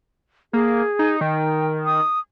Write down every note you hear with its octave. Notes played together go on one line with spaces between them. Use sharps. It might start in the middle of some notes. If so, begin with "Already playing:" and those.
A#3 G#4
D#4
D#3 G5
D#6